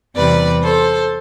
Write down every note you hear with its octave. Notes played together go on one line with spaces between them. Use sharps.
E2 C3 G3 B4 D5
A4 C5